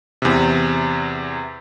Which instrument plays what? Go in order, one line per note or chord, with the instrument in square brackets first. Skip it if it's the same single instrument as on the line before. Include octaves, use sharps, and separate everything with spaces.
[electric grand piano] E2 C3